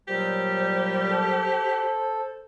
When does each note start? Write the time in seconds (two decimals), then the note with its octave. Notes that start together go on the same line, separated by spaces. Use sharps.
0.08 A#2 F#3 G3 G4 C5
1.09 A4